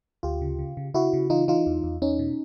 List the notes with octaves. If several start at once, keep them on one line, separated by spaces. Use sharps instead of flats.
D2 F4 G4
C#3
C#3
C#3
C#3 E4 F#4
C#3
E3 D#4 F4
E3 D#4 F4
E2
E2
E2 C#4 D#4
B2